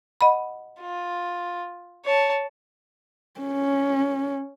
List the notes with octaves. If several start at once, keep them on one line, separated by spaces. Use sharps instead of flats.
D#5 F#5 B5
F4
C#5 A5
C#4